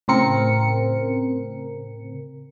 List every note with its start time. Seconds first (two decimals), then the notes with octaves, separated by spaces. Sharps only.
0.08 A2 C#3 C4 A#4 C#7